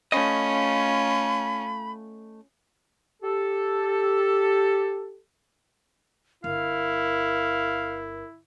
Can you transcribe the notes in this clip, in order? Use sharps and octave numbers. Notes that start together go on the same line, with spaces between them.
A3 C#4 F4 D#5 B5
G4 A4
G1 E4 A#4 F5